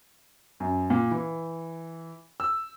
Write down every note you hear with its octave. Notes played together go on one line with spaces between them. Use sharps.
F#2
A#2
E3
E6